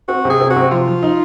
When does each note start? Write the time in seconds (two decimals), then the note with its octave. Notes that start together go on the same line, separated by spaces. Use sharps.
0.08 C4 F#4
0.25 C3 G#4
0.40 C4
0.50 F#4
0.56 C3
0.71 F3 F4
0.87 F3
1.03 D#4